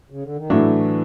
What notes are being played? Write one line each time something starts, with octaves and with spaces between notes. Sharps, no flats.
C#3
D3
D#3
A2 E3 F#3 A3 D4